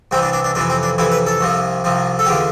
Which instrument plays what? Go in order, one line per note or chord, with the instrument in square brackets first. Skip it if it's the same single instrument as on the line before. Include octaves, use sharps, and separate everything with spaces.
[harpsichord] C2 C3 E3 C4
D4
D4
D4
F2 C3 E3 D4
C4
D4
F2 C3 E3 E4
B4
A4
C2 C3 F3
C2 C3 F3
A4
E2 D3 F3 G4